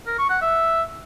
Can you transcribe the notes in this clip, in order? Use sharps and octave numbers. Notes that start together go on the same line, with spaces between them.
A#4
C#6
F#5
E5